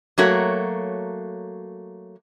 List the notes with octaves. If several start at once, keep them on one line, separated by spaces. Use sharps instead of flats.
F#3 A3 A#3 F#4 C#5